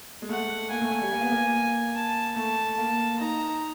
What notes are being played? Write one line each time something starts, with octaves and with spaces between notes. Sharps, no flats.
G#3
A3 F#5
A#3 G#5
A3
A3
G3
A#3
B3
A#3
A5
A3 A5
A#3
D#4 A#5